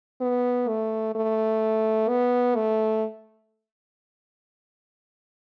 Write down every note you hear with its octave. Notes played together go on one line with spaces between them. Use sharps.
B3
A3
A3
B3
A3